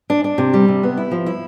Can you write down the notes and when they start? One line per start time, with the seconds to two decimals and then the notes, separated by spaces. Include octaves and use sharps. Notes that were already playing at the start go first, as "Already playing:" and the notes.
0.10 D4
0.24 D4
0.38 C3
0.53 G3
0.68 C3
0.83 B3
0.97 E4
1.11 F3
1.26 E4